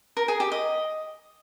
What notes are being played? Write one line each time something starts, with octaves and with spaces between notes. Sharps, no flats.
A#4
G#4
G4
D#5